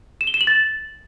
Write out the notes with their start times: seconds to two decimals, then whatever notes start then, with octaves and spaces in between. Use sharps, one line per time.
0.21 E7
0.27 G7
0.34 E7
0.41 F#7
0.47 A6